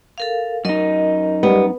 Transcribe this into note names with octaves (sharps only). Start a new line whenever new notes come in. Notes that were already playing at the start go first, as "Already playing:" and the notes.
A4 A#4 F5
F#2 D#4 A#4 D#5
G3 B3